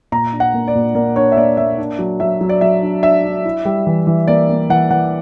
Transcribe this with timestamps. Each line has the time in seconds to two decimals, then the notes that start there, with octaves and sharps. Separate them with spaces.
0.12 A#2 A#5
0.33 D4
0.40 F#5
0.54 A#3
0.68 D5
0.75 A#2
0.95 A#3 D5
1.16 D4 C#5
1.32 E5
1.37 A#3 D5
1.57 A#3 E5
1.78 D4
1.99 F#3
2.20 F#3 E5
2.41 F#3
2.49 D5
2.61 F#3 E5
2.83 D4
3.03 D4 E5
3.25 D4
3.44 E4
3.65 G3
3.87 E3
4.07 E3
4.28 A#3 D5
4.49 A#3
4.70 E3 F#5
4.91 E3 F#5